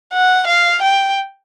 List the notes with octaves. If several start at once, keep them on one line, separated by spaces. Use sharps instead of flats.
F#5
F5
G5